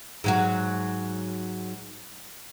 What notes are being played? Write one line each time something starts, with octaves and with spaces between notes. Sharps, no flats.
G#2 F#3 F#4